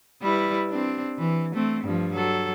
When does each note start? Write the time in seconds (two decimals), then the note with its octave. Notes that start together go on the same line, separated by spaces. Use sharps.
0.22 G3 E4 B4
0.70 C4 D4
1.18 E3
1.55 A3 C4
1.84 G2 F3
2.14 F#3 A4